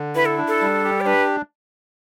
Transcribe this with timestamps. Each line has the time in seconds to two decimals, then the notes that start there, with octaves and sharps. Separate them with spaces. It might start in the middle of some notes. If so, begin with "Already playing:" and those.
Already playing: D3
0.15 E4 B4
0.26 A4
0.38 D4
0.48 A4
0.61 G3
0.84 G4
1.01 D5
1.06 D4 B4